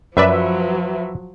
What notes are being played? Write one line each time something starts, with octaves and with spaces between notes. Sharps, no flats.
F#2 F3 F#3 B4 D5 E5